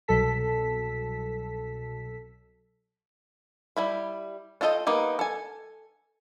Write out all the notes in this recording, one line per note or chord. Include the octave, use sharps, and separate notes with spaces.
C2 B2 F#3 A4 A5 B6
G3 E4 B5
D4 F4 A4 D#5 G5
A#3 B3 D#4 G4
A4 G#5